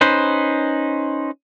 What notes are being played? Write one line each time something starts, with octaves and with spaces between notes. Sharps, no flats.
C#4 D#4 B4 C5